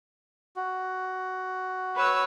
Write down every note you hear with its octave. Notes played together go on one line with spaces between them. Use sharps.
F#4
B4 C#5 E6